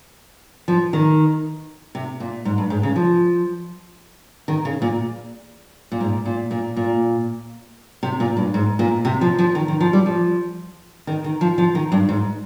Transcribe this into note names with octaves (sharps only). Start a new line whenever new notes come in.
F3
D#3
C3
A#2
G#2
G2
G#2
C#3
F3
D#3
C#3
A#2
A#2
G#2
A#2
A#2
A#2
C3
A#2
G2
G#2
A#2
C3
F3
F3
D#3
D#3
F3
G3
F3
D#3
D#3
F3
F3
D#3
G2
G#2